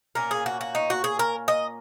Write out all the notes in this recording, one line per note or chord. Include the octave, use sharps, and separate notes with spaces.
A#2 A#3 C#4 A#4
G#4
F#4
F#4
D#4
F#4
G#4
A#4
D#5